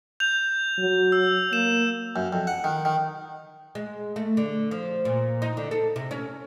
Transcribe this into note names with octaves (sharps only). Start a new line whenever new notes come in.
G6 F7
F#3
E6
A#3 E7
F#2
F2
F#5
D#3
D#3
G#3
A3
D3
F3
A#2
D#4
D3
A4
C3
C#4